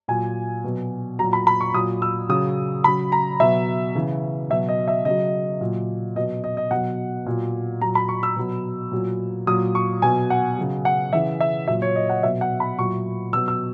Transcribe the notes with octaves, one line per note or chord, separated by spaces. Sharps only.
A#2 F#3 G#5
B2 F#3
A#2 F#3 A#5
B5
B5
C#6
A#2 F#3 D#6
E6
C#3 F#3 D#6
C#3 F#3 B5
A#5
B2 F#3 E5
C#3 E3
B2 F#3 E5
D#5
E5
C#3 F#3 D#5
A#2 F#3
B2 F#3 D#5
D#5
D#5
B2 F#3 F#5
A#2 F#3
A#2 F#3 A#5
B5
C#6
E6
B2 F#3
A#2 F#3
A#2 F#3 D#6
C#6
B2 F#3 G#5
F#5
C#3 F#3
F#5
C#3 E3 E5
E5
A#2 F#3 E5
C#5
D#5
F#5
B2 F#3 E5
F#5
B5
A#2 F#3 C#6
B2 F#3 E6
E6